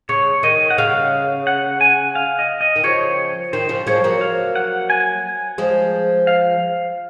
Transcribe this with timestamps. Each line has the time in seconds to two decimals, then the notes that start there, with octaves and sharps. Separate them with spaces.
0.09 C#3 C#5
0.43 D#3 D#5
0.70 F#5
0.78 C#3 F5
1.47 F#5
1.81 G#5
2.15 F5
2.39 D#5
2.61 D#5
2.76 D#3
2.83 C#3 F3 C#5
3.53 D#3 C5
3.69 C#3 F3
3.87 F3 G#3 C#5
4.04 F#3 A#3
4.21 F5
4.56 F#5
4.90 G#5
5.58 F3 G#3
6.27 F5